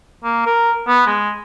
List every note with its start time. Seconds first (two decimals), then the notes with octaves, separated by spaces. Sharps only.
0.24 A#3
0.46 A#4
0.88 B3
1.07 G#3